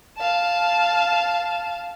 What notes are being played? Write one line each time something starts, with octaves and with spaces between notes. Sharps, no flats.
F5 A5